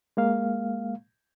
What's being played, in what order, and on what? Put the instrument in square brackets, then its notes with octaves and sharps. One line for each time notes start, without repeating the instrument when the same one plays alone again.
[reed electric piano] G#3 A#3 F5